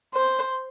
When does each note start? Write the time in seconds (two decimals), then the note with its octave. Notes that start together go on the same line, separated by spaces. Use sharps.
0.15 C5